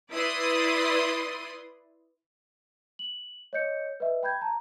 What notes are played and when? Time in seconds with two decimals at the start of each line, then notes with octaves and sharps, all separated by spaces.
0.11 E4 B4 D5 C6 D#6
2.99 F#7
3.53 C#5 D#5 G6 C#7
4.00 B4 D#5 E5
4.23 G5 B5 G6 G#6
4.41 A5 A#5